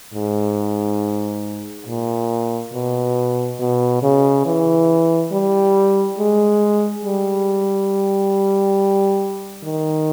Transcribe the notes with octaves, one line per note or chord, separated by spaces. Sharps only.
G#2
A#2
B2
B2
C#3
E3
G3
G#3
G3
D#3